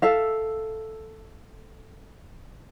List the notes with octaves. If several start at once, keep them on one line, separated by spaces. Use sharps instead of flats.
A4 E5 F5